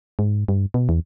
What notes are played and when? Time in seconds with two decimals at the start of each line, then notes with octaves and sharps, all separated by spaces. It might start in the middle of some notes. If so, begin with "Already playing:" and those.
0.19 G#2
0.48 G2
0.74 B2
0.89 E2